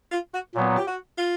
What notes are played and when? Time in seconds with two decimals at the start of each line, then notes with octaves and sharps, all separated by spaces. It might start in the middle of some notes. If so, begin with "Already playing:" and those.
0.12 F4
0.33 F#4
0.55 A#2 F#3 B3
0.77 G4
0.86 F#4
1.18 F4